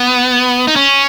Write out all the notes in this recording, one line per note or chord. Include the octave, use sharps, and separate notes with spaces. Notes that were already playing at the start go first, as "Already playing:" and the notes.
Already playing: B3
D#4
C#4